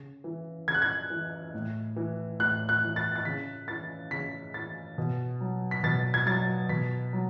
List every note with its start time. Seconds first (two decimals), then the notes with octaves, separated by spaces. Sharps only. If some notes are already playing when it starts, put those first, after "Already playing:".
Already playing: C#3
0.24 E3
0.68 C#3 G#6
0.74 F#6
0.82 G#6
1.10 E3
1.54 A2
1.96 E3
2.39 A2 F#6
2.69 F#6
2.83 E3
2.96 A6
3.15 A6
3.25 C#3 B6
3.68 E3 A6
4.11 C#3 B6
4.54 E3 A6
4.98 B2
5.41 F#3
5.71 B6
5.83 B2 A6
6.14 G#6
6.26 F#3 A6
6.69 B2 B6
7.13 F#3